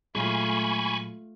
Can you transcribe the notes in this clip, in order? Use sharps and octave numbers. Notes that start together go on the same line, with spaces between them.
A#2 F#3 G#3 A3 F4 G#5 B5 C#6